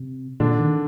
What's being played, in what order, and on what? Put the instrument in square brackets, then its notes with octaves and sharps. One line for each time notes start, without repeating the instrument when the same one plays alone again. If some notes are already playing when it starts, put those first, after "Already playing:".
Already playing: [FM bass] C3
[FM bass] A#2 [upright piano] D3 D4
[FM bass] D#3